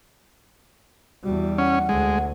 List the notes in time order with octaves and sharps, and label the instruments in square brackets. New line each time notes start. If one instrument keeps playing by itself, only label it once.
[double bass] E2 G3 [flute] F#4
[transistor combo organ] C#4 [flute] F#5
[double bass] D2 [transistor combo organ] G#3